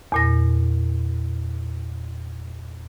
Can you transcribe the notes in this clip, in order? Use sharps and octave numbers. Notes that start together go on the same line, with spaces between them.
E2 A#2 A#6